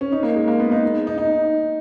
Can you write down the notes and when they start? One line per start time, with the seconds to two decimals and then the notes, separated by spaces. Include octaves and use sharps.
0.01 C#4
0.12 D#4
0.23 A#3
0.36 G#3
0.48 A#3
0.60 B3
0.72 D#4
1.07 D#4
1.18 D#4